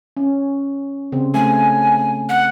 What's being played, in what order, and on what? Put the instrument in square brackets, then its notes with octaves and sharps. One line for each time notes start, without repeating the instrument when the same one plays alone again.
[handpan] C#4
C#3 C4
[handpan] A3 [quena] G#5
[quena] F#5